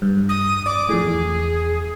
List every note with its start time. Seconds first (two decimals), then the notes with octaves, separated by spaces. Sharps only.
0.02 G2
0.29 D#6
0.66 D5 D6
0.89 F2 A2 G#4
1.06 E2